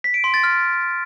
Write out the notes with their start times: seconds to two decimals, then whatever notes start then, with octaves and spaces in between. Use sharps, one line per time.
0.04 B6
0.14 D7
0.24 C6
0.34 A6
0.44 F6